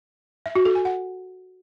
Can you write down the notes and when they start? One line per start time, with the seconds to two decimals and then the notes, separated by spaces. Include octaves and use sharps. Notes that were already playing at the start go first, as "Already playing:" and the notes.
0.46 E5
0.55 F#4
0.65 A4
0.75 G#5
0.85 F#5